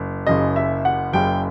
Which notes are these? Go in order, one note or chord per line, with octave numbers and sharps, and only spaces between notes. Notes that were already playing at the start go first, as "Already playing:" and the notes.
Already playing: F#1
F#1 F#2 C#3 D#5
E5
F#5
F#1 F#2 C#3 G5